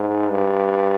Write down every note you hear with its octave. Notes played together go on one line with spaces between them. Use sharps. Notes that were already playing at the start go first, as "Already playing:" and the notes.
Already playing: G#2
G2